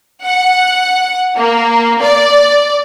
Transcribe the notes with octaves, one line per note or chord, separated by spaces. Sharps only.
F#5
A#3
D5